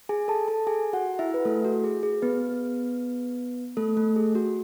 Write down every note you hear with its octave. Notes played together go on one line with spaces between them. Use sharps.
G#4 G#5
A4 A5
A4 A5
G#4 G#5
F#4 F#5
E4 E5
B4
A3 A4
F#4
G#4
G#4
B3 B4
A3 A4
A3 A4
G#4
F#4